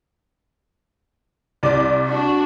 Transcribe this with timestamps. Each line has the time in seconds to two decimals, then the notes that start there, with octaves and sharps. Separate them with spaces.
1.63 C2 D5
2.08 D4 F#4